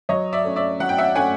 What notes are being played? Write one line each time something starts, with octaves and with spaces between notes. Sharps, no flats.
F#3 C#5 D#5
D5 E5
A3 C#4
D5 E5
F#3 F#5
G5
E5 F#5
A3 C#4 F#5 G#5